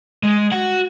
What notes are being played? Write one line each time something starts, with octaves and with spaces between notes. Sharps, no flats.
G#3
F#4 F#5